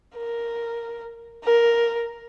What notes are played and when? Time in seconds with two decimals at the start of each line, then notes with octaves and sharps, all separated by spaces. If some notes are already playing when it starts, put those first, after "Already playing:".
0.17 A#4
1.44 A#4